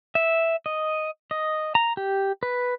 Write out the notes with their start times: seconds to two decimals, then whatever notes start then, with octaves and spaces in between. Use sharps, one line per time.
0.15 E5
0.66 D#5
1.31 D#5
1.75 A#5
1.97 G4
2.43 B4